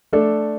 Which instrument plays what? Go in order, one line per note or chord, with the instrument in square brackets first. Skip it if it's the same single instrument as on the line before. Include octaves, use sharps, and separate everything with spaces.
[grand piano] A3 D4 A4